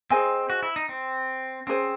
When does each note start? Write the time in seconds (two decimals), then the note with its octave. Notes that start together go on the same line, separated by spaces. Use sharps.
0.10 C4 G#4 C5 D#5 G#5
0.50 F#4
0.63 E4
0.76 D#4
0.89 C4
1.67 C4 C#4 G#4 C5